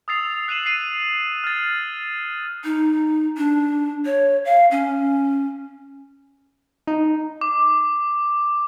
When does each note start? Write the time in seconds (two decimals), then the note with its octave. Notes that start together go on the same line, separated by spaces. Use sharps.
0.08 D#6 E6 A6 C7 F7
0.48 F#6 C7 D#7 E7 F#7
0.66 C7 D#7
1.44 F6 A6
2.64 D#4
3.37 D4
4.05 C#5
4.45 F5
4.71 C#4
6.87 D#4
7.41 D6